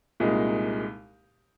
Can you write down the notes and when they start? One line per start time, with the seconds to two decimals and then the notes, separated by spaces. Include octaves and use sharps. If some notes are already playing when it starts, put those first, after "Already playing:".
0.20 C2 A#2 G#3 D#4